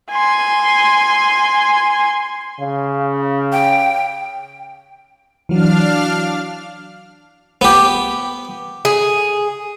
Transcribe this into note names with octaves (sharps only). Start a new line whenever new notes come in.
G#5 C6
C#3
G5
E3 F#3 D4 F5 F6
B3 G4
G#4